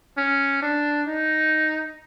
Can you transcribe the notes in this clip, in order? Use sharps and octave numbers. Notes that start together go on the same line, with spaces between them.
C#4
D4
D#4